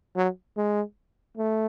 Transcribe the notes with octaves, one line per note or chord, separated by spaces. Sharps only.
F#3
G#3
A3